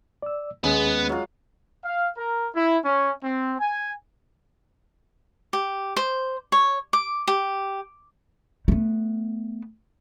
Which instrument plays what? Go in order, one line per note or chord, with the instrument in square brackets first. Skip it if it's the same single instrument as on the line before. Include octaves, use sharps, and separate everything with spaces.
[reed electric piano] D5 E6
[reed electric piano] D#2 C#4 [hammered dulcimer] G#3 [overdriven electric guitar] B3
[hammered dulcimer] F#3 F4
[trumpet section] F5
A#4
E4
C#4
C4
G#5
[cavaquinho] G4
C5
C#5
D6
G4
[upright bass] A3 B3